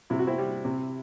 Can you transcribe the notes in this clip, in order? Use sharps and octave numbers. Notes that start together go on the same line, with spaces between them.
C3 E4
F#4
C4 E4
G3
C3